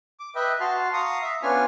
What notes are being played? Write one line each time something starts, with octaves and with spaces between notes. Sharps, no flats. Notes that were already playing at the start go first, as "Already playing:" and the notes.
D6
B4 D#5 E5 G5
F#4 A5 C6 F6
F5 A#5 C#6 D#6
E5
B3 C#4 D4 F4 G#5 F6